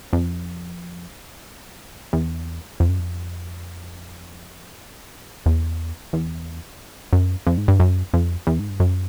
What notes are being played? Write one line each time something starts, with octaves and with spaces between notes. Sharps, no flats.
F2
E2
F2
F#2
F2
E2
E2
F#2
F2
G#2
G2
F#2
F2
E2
G#2
G2
F#2